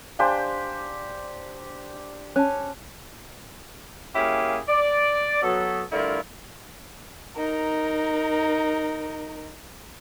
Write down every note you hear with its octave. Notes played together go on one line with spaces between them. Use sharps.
D4 G4 C5 F5 G#5 C6
C#4 A5 F#6
A#3 C#4 E4 G4 G#4 F5
D5
F#3 B3 A4
G2 D3 A3 E4 F4 A#4
D#4 A#4